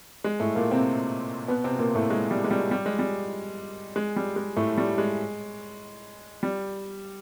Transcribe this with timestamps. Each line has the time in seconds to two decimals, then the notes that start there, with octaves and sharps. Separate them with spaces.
0.24 G#3
0.40 A2 A3
0.55 A#2 A#3
0.71 C3 C4
1.48 B2 B3
1.64 C3 C4
1.79 A#2 A#3
1.95 A2 A3
2.10 G#3
2.31 G3
2.44 G#3
2.51 G3
2.71 G3
2.86 G#3
2.99 G3
3.96 G#3
4.16 G3
4.36 G#3
4.56 A2 A3
4.77 G3
4.98 G#3
6.43 G3